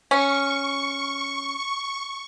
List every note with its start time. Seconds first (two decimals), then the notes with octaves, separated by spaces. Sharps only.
0.11 C#4 C#6